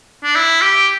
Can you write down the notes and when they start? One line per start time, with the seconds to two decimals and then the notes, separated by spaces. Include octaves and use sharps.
0.24 D4
0.36 E4
0.61 G4